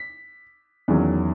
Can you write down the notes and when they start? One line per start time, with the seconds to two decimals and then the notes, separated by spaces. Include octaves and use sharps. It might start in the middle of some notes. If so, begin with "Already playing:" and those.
Already playing: B6
0.88 E2 D#3 F#3 C#4